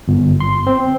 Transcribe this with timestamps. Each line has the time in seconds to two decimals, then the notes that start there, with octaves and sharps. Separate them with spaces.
0.08 G1
0.40 C6
0.67 C4